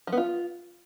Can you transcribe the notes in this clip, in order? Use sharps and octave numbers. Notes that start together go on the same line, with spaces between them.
F3
B3
F4